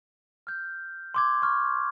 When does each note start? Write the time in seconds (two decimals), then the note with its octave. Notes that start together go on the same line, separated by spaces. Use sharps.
0.47 F6 G6
1.14 C6 D6 G#6
1.42 C#6 F6